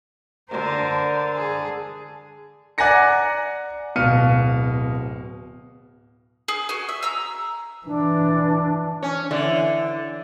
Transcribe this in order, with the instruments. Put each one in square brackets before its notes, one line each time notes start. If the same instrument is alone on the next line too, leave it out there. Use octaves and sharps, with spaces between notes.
[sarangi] D3 [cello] A#4 C5
[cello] G#4
[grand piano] D5 F#5 G#5 A#5 A#6 C#7
D1 B2 F5 F6 C#7 D#7
[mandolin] G#4
F#4 G#5
E5
A#5 E6
[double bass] E3 [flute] D4
[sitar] C#4
[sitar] D3 [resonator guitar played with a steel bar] E3